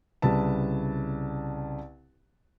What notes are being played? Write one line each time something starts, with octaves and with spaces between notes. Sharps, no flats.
C2 C#3 B4 A5